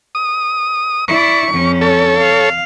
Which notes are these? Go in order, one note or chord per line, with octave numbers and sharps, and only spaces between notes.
D#6
E4 D5 C#6
F2 C#4
A4 C#5
F5